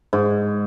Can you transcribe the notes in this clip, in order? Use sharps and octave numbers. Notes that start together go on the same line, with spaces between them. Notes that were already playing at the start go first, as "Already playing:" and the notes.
G#2